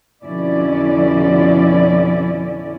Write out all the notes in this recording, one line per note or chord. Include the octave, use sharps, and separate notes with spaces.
F2 B2 D3 C#4 E4 D5